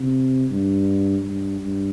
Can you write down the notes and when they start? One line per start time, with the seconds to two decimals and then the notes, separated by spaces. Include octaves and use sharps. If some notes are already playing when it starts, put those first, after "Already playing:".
Already playing: C3
0.50 G2
1.24 G2
1.60 G2